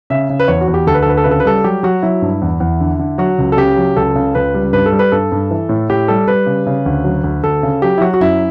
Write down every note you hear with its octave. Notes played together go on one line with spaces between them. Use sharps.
C#3 E5
C#3
B4
E2 C#5
F#4
E2
G4
D2 A4
B4
A4
D2 B4
A4
C#3 B4
A4
B4
G3 A4
F#3 G4
F#3 F#4
F#3 E4
G2
E2
E2
D3
D3
F#3 F#4
C#2
A4
C#3 G4
F#3
C#2 A4
C#3
C#2 B4
G3
G2 B4
A4
G3
B4
G2 A4
G2
E3
A2
A2 G4
G3 A4
G3 B4
C#3
C#3
D2
F#3
D2
D2 A4
C#3
F#3 G4
E4
F#3 F#4
F#4
F#2 E4